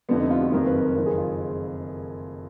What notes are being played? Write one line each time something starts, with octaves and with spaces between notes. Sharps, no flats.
F1 F2 D3 B3
D#4
F4
F#4
F#1 F2 D#3 A#4
B4
A#4
F#1 F2 D#3 A#4
G#4
F4